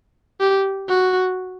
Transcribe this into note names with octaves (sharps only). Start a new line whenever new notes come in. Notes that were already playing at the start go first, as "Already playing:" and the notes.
G4
F#4